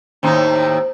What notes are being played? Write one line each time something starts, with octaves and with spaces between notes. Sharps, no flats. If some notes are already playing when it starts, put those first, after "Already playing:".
D#2 A2 D#4 C5